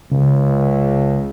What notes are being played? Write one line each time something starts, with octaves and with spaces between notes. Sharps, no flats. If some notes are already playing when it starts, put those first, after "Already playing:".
C#2 C#3